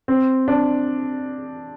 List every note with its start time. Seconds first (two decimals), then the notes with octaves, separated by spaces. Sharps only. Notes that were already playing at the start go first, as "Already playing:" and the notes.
0.08 C4
0.48 D4